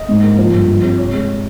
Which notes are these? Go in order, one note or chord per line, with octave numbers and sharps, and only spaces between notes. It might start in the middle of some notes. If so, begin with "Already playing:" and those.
Already playing: D#5
G#2
A#3
F3 C5
G2
F3
C4
C3 C#5
G#3